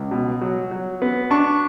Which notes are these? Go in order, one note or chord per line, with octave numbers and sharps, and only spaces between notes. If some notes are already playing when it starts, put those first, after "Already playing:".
Already playing: C#2
B2
F#3
F#3
B3
D4 C#6